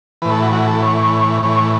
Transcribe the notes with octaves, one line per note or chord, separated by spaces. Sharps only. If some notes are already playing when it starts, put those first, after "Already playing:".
A2 E3 B4
A4
F#4
F#4
A4
C#5
A2 E3 C#5